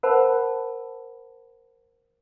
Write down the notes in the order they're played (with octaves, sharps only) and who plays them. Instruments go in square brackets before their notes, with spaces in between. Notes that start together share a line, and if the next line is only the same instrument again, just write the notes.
[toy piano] A#4 C5 F#5 A5 B5